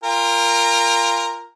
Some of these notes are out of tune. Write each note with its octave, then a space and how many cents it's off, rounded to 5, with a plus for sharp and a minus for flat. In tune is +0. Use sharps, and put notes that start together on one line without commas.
F4 -15 A#4 +0 G5 +35